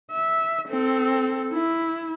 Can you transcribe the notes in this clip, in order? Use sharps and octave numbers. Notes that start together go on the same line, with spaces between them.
E5
C4 A4
E4